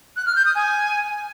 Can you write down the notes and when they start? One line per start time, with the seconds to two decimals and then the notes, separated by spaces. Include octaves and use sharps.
0.16 F#6
0.26 F6
0.36 G6
0.45 D#6
0.55 G#5